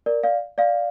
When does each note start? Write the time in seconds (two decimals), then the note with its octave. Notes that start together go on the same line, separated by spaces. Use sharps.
0.06 A#4 D5
0.23 D5 F5
0.58 D5 F5